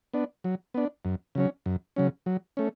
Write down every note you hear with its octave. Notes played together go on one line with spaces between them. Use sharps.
B3 D4
F#3
B3 D4
F#2
C#3 F#3 C#4
F#2
C#3 F#3 C#4
F#3
A3 C#4